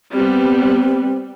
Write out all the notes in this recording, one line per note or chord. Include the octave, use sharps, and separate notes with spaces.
G3 B3 C4